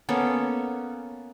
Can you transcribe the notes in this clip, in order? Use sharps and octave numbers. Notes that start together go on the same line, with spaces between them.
A#3 B3 C#4 A4